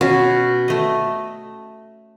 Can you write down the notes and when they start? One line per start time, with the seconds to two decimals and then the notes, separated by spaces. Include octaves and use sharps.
0.01 B2 C#4
0.68 A3 D#5